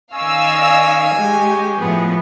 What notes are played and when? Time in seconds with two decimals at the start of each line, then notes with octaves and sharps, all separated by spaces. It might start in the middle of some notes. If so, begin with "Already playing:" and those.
0.14 D#3 C#4 D5 D#5 F5 G#5 E6
1.18 G#3 C#4 G4
1.80 A2 F3 B3 G#4